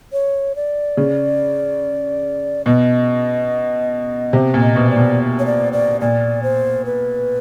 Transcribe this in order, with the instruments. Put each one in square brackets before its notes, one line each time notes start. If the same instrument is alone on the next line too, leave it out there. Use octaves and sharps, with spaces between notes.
[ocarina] C#5
D5
[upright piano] C#3
[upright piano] B2 [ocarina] D#5
[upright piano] C3
A#2
[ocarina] D#5
[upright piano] B2
[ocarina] D5
[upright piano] B2
[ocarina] C#5
D5
D5
[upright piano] A#2 [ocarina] D5
[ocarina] C5
B4